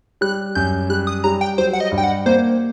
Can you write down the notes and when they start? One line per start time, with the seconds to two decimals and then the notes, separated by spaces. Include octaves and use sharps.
0.21 G3 F#6
0.55 F#2 G6
0.89 G3 F#6
1.07 D#6
1.24 G3 A#5
1.41 G5
1.58 F#3 C5
1.73 F#5
1.80 D#5
1.92 G2
1.98 G5
2.04 F#5
2.26 A#3 C5